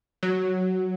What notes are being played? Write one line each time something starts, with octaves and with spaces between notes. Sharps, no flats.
F#3